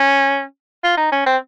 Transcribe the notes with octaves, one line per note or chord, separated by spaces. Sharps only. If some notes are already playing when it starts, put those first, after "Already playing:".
Already playing: C#4
F4
D#4
C#4
C4